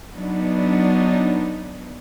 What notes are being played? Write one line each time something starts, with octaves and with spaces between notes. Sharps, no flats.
F#3 B3 D4 D#4